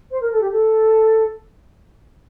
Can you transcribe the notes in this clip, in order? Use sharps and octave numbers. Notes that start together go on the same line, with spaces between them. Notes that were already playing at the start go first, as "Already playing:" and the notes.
C5
A#4
A4
G4
A4